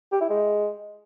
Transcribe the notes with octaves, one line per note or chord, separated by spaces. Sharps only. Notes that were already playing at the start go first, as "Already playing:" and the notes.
G4
E4
G#3